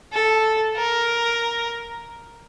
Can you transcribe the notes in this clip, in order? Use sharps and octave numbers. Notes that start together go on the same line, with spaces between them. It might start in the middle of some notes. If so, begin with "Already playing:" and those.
A4
A#4